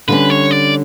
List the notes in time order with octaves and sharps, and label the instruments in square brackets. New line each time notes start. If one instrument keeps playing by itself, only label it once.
[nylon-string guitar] D3 G3 C#4 [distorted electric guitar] B4
[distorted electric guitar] C#5
D5